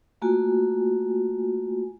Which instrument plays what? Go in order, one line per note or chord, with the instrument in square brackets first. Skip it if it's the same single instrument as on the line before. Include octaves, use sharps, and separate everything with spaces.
[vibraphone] A3 A#3 F4 F#4 G#5